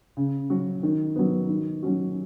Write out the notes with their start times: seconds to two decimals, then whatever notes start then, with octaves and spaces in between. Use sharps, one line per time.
0.17 C#3
0.50 F#3 C#4 F#4
0.83 D#3
1.16 F#3 B3
1.49 D#3
1.82 F#3 C#4 F#4